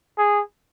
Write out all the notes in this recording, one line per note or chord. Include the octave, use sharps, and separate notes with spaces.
G#4